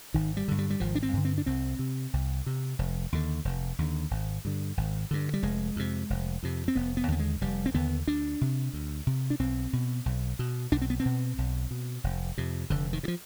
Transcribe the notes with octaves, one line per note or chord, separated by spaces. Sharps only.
G#1 D#3
G3
G2 D3
G3
G3
G#1 F3
D4
C4
G2 D3
C4
D4
C2 C4
C3
C2
C3
F1
D#2 D3
F1
D#2 D3
G#1
G2 D3
G#1
G2 D3
G3
F1 G#3
F2 C3
F1
F2 C3
C4
F1 B3
B3
D#2 D3 B3
G#3
F1 G3
C4
D#2 D3 B3
D2 D4
C3
D2
C3
D4
B1 C4
B2
B1
B2
B1 D4
C4
B3
C4
B2
B1
B2
F1
F2 C3
F1 D3
D#3
C3
F3